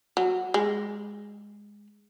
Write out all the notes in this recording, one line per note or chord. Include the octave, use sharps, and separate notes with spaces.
F#3
G#3